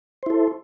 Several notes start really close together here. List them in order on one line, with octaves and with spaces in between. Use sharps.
C5 E4 A4